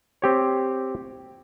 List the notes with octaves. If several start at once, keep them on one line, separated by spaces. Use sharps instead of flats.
C4 G4 C#5